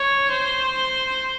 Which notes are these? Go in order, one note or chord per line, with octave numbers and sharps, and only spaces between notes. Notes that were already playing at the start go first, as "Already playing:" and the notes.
Already playing: C#5
C5